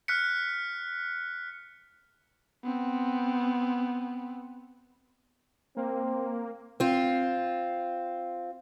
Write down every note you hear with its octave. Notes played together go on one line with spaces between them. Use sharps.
F6 F#6 B6 C#7
B3 C4
A#3 C4
C4 F4